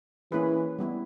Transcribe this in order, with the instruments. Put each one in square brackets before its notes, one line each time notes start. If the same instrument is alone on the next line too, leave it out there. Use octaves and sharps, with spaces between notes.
[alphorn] E3 [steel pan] A#3 C#4 E4 G#4 B4
[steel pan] G3 B3 E4